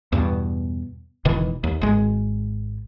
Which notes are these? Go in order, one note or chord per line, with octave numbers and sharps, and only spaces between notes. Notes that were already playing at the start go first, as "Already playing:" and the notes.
E2 G2 B2
E1 B2 D#3 E3
D#2
G#1 G#3